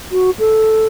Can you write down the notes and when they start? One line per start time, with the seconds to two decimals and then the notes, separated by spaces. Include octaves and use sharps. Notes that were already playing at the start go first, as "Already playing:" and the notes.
0.12 F#4
0.39 A4